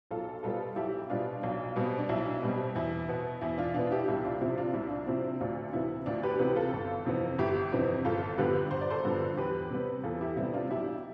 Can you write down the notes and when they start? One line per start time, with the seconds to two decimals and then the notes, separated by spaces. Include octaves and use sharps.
0.11 B1 F4 A4
0.43 B2 G3 B3 F4 A4
0.76 B1 E4 G4
1.10 B2 G3 B3 D4 F4
1.43 B1
1.76 B2 G3 C4
1.98 D4
2.09 B1 E4
2.42 B2 G3 C4
2.75 E2 E4
3.09 B2 B3
3.41 E2 E4
3.58 D4 F4
3.74 B2 B3 D4 F4
3.91 E4 G4
4.08 C2 E4 G4
4.24 D4 F4
4.41 C3 F3 C4 E4
4.58 D4 F4
4.73 C2 E4
4.91 D4
5.07 C3 F3 C4 E4
5.24 E4
5.40 D2 D4 F4
5.73 C3 E3 B3 E4
6.06 D2 D4 F4
6.23 G4 B4
6.39 C3 E3 B3 G4 B4
6.56 F4 A4
6.73 G1
7.05 F2 C3 E3 B3
7.38 G1 E4 G4
7.72 F2 C3 E3 B3
8.05 G1 F4 A4
8.38 G2 D3 F3 B3 G4 B4
8.71 G1 C5
8.81 D5
8.90 A4 C5
9.05 G2 D3 F3 B3
9.37 E2 G4 B4
9.70 C3 G3 B3
10.03 E2 F4 A4
10.21 E4 G4
10.36 C3 G3 B3 E4
10.54 D4 F4
10.70 B1 E4 G4